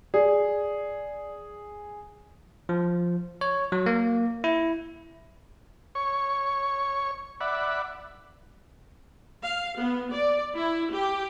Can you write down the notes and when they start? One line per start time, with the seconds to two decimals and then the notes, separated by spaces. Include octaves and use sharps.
0.14 G#4 D5
2.69 F3
3.41 C#5
3.72 F#3
3.86 A#3
4.44 E4
5.95 C#5 C#6
7.41 D5 E5 F#5 B5
9.43 F5
9.79 B3
10.13 D5
10.55 E4
10.92 G4